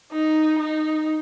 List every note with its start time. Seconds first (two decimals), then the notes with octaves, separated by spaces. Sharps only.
0.12 D#4
0.59 D#4